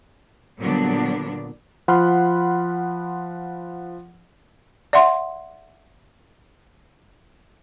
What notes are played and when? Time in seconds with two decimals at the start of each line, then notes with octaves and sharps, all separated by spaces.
0.59 A#2 D3 F#3 G3 B3 D4
1.88 F3 F#5 B5 C6 F6
4.93 D5 E5 F#5 C6